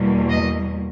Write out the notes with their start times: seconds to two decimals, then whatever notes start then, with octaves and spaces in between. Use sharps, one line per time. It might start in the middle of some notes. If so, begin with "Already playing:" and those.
Already playing: E2 B2 G3 A#3
0.29 D#5